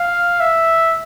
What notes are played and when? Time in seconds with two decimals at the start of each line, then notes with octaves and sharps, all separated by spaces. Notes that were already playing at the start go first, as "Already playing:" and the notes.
Already playing: F5
0.40 E5